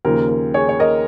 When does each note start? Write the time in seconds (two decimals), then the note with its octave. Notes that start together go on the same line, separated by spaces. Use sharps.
0.05 D#2 C#3 F3 A#3 A#4
0.29 A#4
0.54 G#4 C#5
0.69 C#5
0.79 A#4 D#5